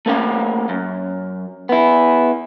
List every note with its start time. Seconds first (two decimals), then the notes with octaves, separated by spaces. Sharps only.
0.06 A3 A#3 C#4 F5
0.69 F#2
1.69 B3 E4